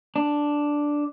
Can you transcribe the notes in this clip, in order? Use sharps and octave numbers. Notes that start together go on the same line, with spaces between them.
D4